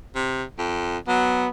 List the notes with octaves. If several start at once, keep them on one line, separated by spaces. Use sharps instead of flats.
C3
F2
F#3 B3